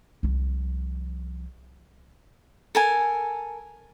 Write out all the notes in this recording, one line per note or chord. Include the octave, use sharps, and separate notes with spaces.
C2 F3
A4 A#4 G#5